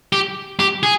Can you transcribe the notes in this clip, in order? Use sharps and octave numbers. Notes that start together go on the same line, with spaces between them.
G4
G4
G#4